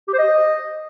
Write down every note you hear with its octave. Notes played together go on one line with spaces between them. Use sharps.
G4
C5
D#5